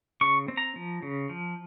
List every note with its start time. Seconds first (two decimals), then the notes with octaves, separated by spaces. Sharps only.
0.21 C#3 C#6
0.48 C4
0.57 A#5
0.76 F3
1.02 C#3
1.29 F3